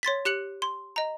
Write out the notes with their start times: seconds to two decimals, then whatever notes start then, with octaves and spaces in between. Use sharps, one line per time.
0.03 C#5 C6 A6 B6
0.25 G4 F#6 C#7 F#7
0.62 C6
0.96 D#5 A#5